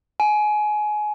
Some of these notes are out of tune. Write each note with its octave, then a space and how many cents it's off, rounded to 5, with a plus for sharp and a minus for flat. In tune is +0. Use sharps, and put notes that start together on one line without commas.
G#5 +25